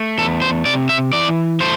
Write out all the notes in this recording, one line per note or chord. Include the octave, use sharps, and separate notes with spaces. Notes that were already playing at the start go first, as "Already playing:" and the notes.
Already playing: A3
E2 A4
C5
C3 D5
E5
E3 D5
A3 C5